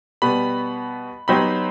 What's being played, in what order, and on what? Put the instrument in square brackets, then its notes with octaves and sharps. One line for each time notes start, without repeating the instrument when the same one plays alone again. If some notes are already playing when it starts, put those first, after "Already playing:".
[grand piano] B2 G3 B3 [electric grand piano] B5
[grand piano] F#3 B3 D#4 G4 C5 [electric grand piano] B5